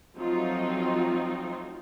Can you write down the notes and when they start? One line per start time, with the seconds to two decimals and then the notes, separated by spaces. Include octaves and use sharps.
0.15 F3 F#3 A3 C4 D#4 F4